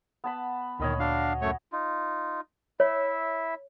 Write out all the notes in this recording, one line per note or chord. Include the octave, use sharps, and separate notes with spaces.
B3 A5 B5
D2 A#2 D#3 C#5 D#5 B5
D4 F#4 F5
F#2 A3 C#5
D#4 F4
E4 C#5 E5